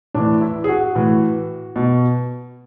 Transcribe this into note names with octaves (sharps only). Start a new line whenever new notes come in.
A2 E3 D4
E4
G#4
F#4
A2 E3
B2